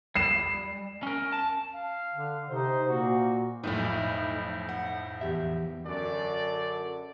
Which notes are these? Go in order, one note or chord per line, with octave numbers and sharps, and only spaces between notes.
G3 C7 E7
C#4 A#4
A5
F5
D3
C3 D#4 C5
A#2 A#3 F#4
B1 F2 A2 D#4 E4
F#5
E2 G4 E5
F#2 D3 A4 D5